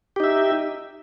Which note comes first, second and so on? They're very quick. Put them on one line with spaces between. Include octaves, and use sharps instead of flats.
G4 D#4 E5